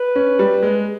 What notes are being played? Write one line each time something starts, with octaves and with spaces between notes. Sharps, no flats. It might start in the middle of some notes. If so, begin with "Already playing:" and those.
Already playing: B4
C#4
G3
G#3